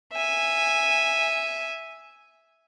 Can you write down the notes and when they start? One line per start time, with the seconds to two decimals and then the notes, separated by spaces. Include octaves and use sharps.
0.14 E5 G#5